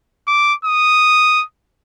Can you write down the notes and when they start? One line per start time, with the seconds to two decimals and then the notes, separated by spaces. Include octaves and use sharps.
0.27 D6
0.65 D#6